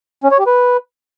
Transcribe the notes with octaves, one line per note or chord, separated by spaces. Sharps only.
C#4
C#5
G4
B4